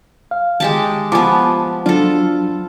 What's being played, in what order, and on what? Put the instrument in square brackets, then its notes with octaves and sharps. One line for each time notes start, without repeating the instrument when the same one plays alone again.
[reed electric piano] F5
[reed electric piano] D#3 [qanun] G#3 G4 A5
[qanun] F3 B3 [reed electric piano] G#5 A5 D6
[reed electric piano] F#3 D4 [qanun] F4 A4